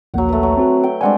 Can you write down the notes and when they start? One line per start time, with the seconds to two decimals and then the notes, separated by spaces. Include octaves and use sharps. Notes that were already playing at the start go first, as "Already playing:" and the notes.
0.14 A#1 D#2 F#3 A#3 F#5
0.29 A3 B4
0.43 F#3
0.57 C4 F#4
0.84 G5
1.01 G3 G#3 C4 D4 F#5 G#5